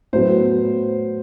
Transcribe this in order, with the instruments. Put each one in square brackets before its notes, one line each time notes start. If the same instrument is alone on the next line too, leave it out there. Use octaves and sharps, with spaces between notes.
[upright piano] A2 F#3 B3 [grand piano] C5